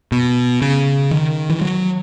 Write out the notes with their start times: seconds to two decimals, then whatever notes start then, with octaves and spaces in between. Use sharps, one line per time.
0.12 B2
0.62 C#3
1.11 D#3
1.50 E3
1.61 F#3